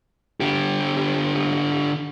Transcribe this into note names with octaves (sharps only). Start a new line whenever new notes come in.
D3 G4